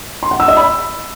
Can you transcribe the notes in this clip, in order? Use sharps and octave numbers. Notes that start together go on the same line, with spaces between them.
C6
F#5
E6
D#5
B5